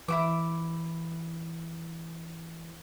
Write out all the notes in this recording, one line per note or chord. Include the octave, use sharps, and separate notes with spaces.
E3 E4 F#4 D6